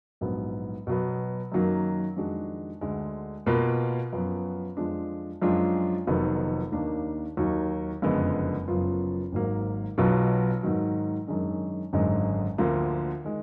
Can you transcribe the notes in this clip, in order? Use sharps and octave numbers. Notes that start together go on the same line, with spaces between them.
A#1 G#2 F#3 B3
B2 F#3 B3
F#2 D#3 F#3 A#3
F2 D#3 G#3 D4 F#4
D2 D3 G#3
B2 A#3 F4 B4
F#2 F3 B3
F2 F3 G#3 D4
F#2 F3 G#3 D4 F4
F1 F2 D#3 F#3 B3
D#2 D#3 A#3 D4
D#2 D#3 F#3
F#1 F2 D3 G#3 B3
F#1 F#2 F3 B3 F4
G#1 G#2 F#3 A#3
B1 B2 F#3 B3 F4
G#2 D#3 F#3
F#2 D#3 G#3 D4
G#1 F#2 D3 G#3 D#4
D2 D3 F3 A#3
D#3 G#3